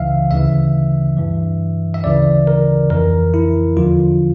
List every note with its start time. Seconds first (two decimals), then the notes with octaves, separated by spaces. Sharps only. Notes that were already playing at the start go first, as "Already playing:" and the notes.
Already playing: C#2 C#3 E3 E5 F5
0.30 D2 C#3 E3 E5
1.17 G2 E3
1.94 E5
2.04 D2 C#3 E3 D5
2.47 A#4
2.90 F2 E3 A#4
3.34 E4
3.77 E2 D3 F3 F4